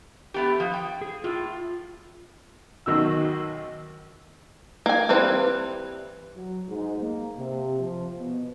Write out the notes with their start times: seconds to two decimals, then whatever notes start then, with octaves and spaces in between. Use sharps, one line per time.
0.34 A3 B3 G4
0.60 F3
0.74 G5
1.01 G#4
1.24 A2 F4
2.86 B1 D#3 F#4 E6
4.86 A#3 G#5
5.09 E3 G3 C4 B4
6.36 F#3
6.68 G#2
7.00 A#3
7.36 C3
7.79 F3
8.17 B2